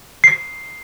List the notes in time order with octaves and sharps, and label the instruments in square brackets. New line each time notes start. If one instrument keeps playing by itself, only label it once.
[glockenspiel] C7